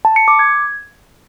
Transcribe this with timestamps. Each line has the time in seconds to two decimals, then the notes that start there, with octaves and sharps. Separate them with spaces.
0.05 A5
0.16 C#7
0.28 D6
0.39 G#6